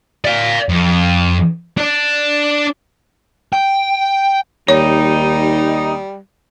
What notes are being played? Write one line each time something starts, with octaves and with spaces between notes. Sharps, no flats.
D5 F5
F2
D4 D5
G5
D#2 G3 D#4 C#5